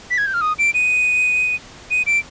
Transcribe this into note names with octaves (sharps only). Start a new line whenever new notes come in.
B6
G#6
G6
F6
D#6
D7
D#7
D#7
D7